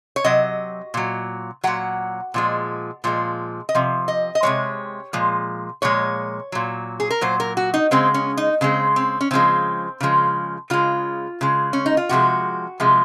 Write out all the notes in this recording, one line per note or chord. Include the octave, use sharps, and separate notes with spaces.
C#5
C3 F#3 D#5
A#2 F#3
A#2 F#3 F#5
A#2 F3 G#3
A#2 F3 G#3
D#5
C3 F3
D#5
D#5
C3 F3 G#3 C#5
A#2 F3 G#3
A#2 F3 G#3 C#5
A#2 F#3
G#4
A#4
A#2 F#3 C5
A#4
F#4
D#4
C#3 G#3 C4
C#4
D#4
C#3 G#3 C4
C4
C#4
C#3 F3 G#3 C4
C#3 F3 G#3
C#3 G#3 F4
C#3 G#3
C#4
D#4
F4
C3 F3 G#3 F#4
C3 F3 G#3